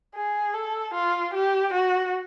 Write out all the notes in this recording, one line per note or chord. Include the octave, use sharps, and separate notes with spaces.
G#4
A4
F4
G4
F#4